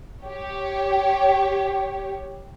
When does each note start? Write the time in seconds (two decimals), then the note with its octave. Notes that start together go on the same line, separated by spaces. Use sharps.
0.23 G4 C#5